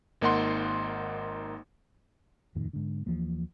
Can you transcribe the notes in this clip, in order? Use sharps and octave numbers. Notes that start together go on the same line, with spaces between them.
G#1 A#3 D#4 F#5 C6
D#1 F2 A2 D#3
G#2 D3
D#2 E3 F3 A#3